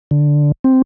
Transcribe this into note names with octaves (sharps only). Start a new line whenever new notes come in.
D3
C4